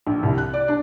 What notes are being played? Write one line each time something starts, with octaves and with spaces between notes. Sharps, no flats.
A#1
C2
F#6
D5
D4